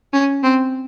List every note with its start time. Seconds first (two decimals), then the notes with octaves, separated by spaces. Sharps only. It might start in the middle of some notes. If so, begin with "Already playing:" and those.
0.13 C#4
0.43 C4